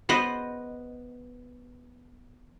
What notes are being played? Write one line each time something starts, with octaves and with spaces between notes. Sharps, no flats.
B3 B4 C5 D#5